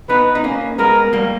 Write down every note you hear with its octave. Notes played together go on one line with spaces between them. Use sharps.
B3 D#4 B4
D#4
A#3 C#4
G#3 B3 A#4
G3 A#3